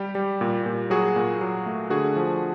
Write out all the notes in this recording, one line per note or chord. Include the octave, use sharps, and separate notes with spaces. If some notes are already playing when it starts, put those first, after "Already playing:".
Already playing: G3 G4
G3
A#2
A#2
F#3 F#4 G#4
A#2
F#3
A3
D3 F#4 G#4
F3